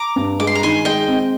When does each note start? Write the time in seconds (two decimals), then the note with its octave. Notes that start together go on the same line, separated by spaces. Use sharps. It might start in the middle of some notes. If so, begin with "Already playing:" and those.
Already playing: A#5 D6
0.16 G2
0.39 G#3 D6
0.47 C6
0.55 A#5
0.63 D#3 G#5 C6
0.85 G#3 D#5 G5
1.08 C4